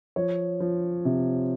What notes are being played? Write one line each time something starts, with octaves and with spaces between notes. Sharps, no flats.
F3 C#5
F3
C3